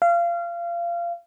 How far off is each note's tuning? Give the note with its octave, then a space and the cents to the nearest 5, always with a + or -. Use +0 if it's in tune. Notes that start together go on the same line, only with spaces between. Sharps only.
F5 -25